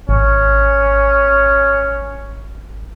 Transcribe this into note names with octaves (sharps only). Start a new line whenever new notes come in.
G#1 C#4